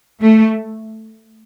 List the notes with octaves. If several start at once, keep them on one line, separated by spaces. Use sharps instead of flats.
A3